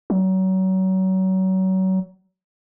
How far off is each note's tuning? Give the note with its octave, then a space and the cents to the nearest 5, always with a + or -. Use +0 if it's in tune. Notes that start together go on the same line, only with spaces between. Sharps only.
F#3 +30